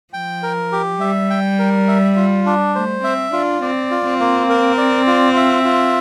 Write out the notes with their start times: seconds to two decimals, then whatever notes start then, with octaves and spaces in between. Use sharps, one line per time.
0.13 F3 G5
0.43 A#4
0.72 G4
1.00 G3 E5
1.30 G5
1.59 A#4
1.88 E5
2.16 F4
2.46 D4
2.75 A3 C5
3.04 C4 E5
3.33 D4 F4
3.62 C4 D5
3.91 F4
4.06 C4
4.20 A#3
4.50 A#4
4.78 D5
5.07 F4
5.36 E5
5.65 F4